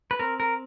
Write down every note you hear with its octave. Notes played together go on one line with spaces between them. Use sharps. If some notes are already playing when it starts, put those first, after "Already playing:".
B4
C4 A#4
A#4